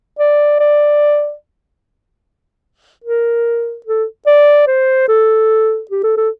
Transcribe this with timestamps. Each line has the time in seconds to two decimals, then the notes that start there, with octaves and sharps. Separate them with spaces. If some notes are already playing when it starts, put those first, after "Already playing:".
0.19 D5
0.60 D5
3.04 A#4
3.86 A4
4.26 D5
4.67 C5
5.08 A4
5.90 G4
6.03 A4
6.17 A4